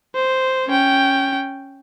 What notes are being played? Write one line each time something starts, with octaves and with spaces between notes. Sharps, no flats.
C5
C#4 G5